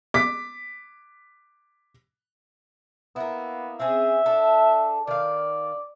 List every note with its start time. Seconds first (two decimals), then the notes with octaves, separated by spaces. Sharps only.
0.14 D6 B6
3.16 A#3 B3 E4
3.80 C4 C#4 G#4 E5
4.26 D4 A4
5.07 D#3 D5 F5